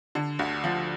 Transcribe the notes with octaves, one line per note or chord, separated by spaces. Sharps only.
D3
D2
F3